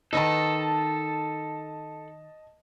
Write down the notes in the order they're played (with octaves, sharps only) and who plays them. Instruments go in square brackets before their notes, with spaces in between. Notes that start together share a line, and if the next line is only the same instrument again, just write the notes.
[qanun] D#3 D#4 B4 [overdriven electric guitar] A4 [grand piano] D#5 A5